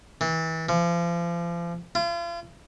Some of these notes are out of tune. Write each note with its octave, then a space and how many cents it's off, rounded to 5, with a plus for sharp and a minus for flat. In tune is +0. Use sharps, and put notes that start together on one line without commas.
E3 -30
F3 -35
F4 -40